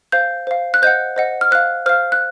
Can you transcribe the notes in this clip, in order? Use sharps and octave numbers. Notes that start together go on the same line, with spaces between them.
C5 F5 G6
C5 F5
F#6
C5 D#5 F#5 G6
C5 D#5 F#5
F6
C5 F5 F#6
C5 F5 F6
F#6